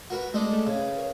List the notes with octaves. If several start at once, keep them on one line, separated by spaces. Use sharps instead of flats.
F#4 A#4 B4
G#3 A3 D4 D#6
A3 A4
C#3 G#6
B4
A#4 C#5